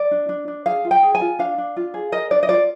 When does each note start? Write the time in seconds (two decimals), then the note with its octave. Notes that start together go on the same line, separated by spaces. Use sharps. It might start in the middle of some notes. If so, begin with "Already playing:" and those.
Already playing: D5
0.11 D4
0.29 D4
0.48 D4
0.66 G#4 F5
0.85 F4
0.91 G5
1.03 G#4
1.15 G#5
1.21 F4
1.39 D4 F5
1.58 D4
1.77 F4
1.94 G#4
2.12 A#4 D#5
2.31 D4 D5
2.43 D#5
2.49 F4 D5